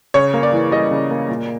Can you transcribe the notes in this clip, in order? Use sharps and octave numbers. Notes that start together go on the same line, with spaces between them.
C#3 C#5
A#3
D5
E3
G3 D#5
C#3
A#3
A#2